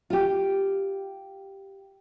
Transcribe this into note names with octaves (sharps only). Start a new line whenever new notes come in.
F4 G4